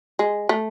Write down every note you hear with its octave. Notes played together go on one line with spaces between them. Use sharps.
G#3
A3